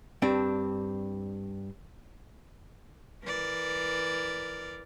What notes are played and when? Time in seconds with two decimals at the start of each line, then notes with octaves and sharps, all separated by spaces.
0.22 G2 C4 D4
3.24 E3 A#4 D5